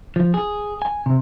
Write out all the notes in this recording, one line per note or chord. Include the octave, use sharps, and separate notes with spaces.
F3
G#4
G#5
C3